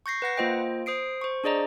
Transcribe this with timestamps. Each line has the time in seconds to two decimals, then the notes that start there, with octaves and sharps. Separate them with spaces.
0.06 C#6 G6 A#6 C7
0.22 B4 F#5 A#6
0.37 A#3 F4 C5 D#5 G5
0.86 C5 D#6 C7 D7
1.22 C5 C#6
1.44 D4 G#4 D5 D#5 A#5